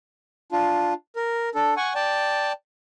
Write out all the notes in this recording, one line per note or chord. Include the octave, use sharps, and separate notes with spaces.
D4 F4
A#4
D4 A4
F#5 G#5 C#6
D5 G5 A5